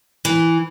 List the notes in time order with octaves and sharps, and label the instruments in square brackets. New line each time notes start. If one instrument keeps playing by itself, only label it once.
[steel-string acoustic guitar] E3